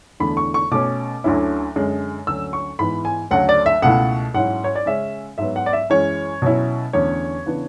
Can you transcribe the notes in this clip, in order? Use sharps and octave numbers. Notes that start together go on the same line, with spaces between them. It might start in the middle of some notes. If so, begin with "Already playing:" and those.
E2 D3 A3 E4 B5
C#6
C#6
B2 A3 C#4 D6
D2 D3 F#3 C#4 E4
F#2 D3 G#3
D2 D3 F#3 C#4 E6
C#6
G#2 E3 B3 E4 B5
G#5
D2 C#3 F#3 A3 F#5
D5
E5
C#2 B2 A3 E4 F#5
G#2 F#3 C#4 E4 F#5
C#5
D5
C#3 G#3 C#4 E5
G#2 F#3 B3 E5
F#5
D5
E5
F#2 E3 G#3 C#4 C#5
B2 F#3 C#4 E4
E2 D3 A3 C#4 C#5
C#3 E3 B3 D4